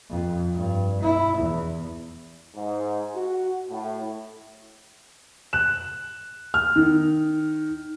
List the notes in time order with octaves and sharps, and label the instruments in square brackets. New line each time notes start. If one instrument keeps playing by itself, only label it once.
[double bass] F2
G2
E4
E2
[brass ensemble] G#2
F#4
A2
[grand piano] F#6 E7
F6
D#3